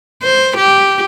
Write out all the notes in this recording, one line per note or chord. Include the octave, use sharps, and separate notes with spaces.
C5
G4